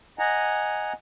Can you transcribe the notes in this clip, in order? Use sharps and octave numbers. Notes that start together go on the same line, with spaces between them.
D#5 F#5 G#5 A#5